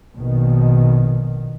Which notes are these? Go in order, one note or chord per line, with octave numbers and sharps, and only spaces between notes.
A#1 B2 D#3